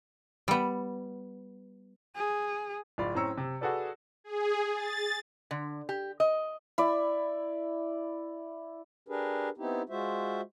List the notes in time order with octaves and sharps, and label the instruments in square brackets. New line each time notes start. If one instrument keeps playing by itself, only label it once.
[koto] G3 B3
[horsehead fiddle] G#4
[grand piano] D1 F4 D5 B5
A2 C4 C#4 A#5 E6 C#7
C3
F#4 G#4 A4 B4 D5
[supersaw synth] G#4
A6
[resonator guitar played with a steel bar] D3
G4
D#5
[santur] E4 D5
[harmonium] D4 G4 G#4 A#4 B4
B3 C4 D#4 E4 G4
G#3 F4 F#4 C5 E5